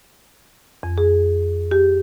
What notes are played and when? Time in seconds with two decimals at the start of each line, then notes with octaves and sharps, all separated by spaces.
0.83 F2
0.98 G#4
1.71 G4